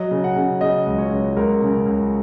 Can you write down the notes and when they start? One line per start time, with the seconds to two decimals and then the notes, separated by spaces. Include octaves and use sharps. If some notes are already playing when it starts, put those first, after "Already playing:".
Already playing: F#3 D#5
0.11 C#3
0.24 F#5
0.36 C#3
0.61 C#3 D#5
0.87 C#2
0.98 C#5
1.11 C#2
1.37 C#2 A#4
1.62 C#3
1.86 C#2